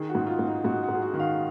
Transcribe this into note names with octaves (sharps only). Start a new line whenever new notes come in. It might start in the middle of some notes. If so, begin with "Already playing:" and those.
Already playing: D#3 G#4
F#4
G#2
F4
G#2
D#4
G#2 F#4
F#4
G#2
G#4
F#4
D#3
F5